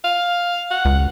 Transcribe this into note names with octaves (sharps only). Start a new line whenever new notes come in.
F5
F#5
C#2